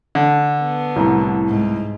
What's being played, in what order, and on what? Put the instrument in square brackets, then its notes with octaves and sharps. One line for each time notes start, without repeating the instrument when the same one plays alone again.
[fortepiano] D3
[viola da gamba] B3
[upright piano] C2 A2 A#5
[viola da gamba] G#2